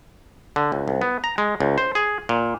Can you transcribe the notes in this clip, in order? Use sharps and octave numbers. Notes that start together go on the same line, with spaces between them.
D3
C#2
C2
B3
A#5
G#3
C#2
C5
G#4
A#2